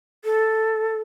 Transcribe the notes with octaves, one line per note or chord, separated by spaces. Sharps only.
A4